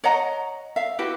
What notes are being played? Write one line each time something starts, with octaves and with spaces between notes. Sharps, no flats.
C#5 D#5 F#5 A#5
E5 F5
E4 F#4 G4 B4